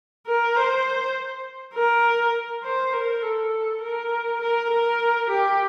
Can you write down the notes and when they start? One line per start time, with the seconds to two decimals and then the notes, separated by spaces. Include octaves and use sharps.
0.27 A#4
0.56 C5
1.75 A#4
2.63 C5
2.93 A#4
3.22 A4
3.82 A#4
4.41 A#4
4.71 A#4
5.30 G4